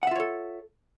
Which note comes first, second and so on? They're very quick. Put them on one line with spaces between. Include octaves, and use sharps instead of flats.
F#5 E5 F4 C#5 A4